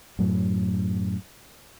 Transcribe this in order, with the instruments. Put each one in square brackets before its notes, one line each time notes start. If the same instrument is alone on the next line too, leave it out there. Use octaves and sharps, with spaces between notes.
[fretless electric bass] F#2 A2 F#3